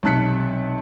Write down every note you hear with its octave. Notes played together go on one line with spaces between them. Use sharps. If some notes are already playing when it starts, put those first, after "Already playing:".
B1 C3 A5 F#6 B6 C#7